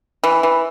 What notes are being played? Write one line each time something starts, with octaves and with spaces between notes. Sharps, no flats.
E3
E3